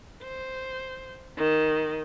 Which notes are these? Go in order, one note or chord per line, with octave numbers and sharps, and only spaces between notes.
C5
D#3